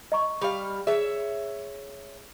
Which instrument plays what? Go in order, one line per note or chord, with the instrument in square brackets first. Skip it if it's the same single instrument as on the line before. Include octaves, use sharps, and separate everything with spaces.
[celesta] D#5 A#5 C#6
[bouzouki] G3 F5
[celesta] G#4 [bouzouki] C#5 E5